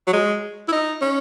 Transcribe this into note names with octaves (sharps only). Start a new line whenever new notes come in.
F#3
G#3
E4
D#4
C#4